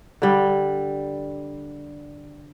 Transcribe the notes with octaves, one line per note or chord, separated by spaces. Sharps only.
D3 G3